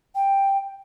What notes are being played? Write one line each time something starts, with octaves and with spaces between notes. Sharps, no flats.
G5